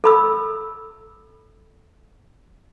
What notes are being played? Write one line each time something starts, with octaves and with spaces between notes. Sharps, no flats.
A4 B5 E6